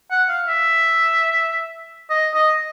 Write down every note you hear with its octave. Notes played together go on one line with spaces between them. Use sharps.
F#5
F5
E5
D#5
D#5